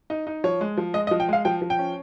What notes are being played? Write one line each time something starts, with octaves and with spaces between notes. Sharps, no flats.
D#4
D#4
F3 C#5
G#3
F3
G#3 D#5
D#5
F3
G5
G#3 F5
F3 G5
F3
G5
C#4